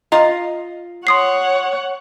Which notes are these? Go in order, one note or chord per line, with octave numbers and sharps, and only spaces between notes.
F4 D#5 A#5
C#5 F#5 C6 D#6 C7